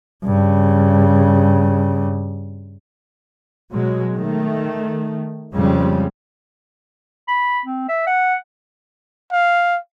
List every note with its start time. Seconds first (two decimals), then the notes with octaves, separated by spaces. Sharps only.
0.25 G2 C#3
3.72 B2 F#3 G#3
4.15 D#3 A3
5.53 F2 C#3 G3 G#3
7.28 B5
7.65 C4
7.88 E5
8.07 F#5
9.32 F5